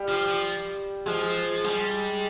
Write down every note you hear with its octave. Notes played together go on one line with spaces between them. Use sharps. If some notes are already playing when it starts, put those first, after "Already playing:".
Already playing: G3 G4
F3
F3
F3 G#3 G#4
G3 G#3 G#4